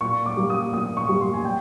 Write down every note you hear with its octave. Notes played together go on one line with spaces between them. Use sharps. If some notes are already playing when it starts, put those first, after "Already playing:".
A#2 C#6
D6
G3 A#3
D#6
A#2 D#6
C#6
G3 A#3
C6
G#5
G5